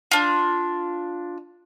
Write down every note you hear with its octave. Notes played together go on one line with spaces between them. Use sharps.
D4 F4